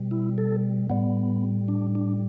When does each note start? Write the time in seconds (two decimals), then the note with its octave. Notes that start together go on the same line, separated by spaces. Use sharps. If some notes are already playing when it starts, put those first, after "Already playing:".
Already playing: B2 G3
0.11 E4
0.38 A4
0.90 A2 G3 B3
1.68 D4
1.95 D4